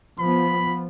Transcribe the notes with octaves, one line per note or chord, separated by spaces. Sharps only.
F3 B3 B5